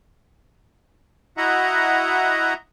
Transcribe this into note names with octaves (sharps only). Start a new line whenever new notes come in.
E4 F#4 D#5 E5 F#5 A#5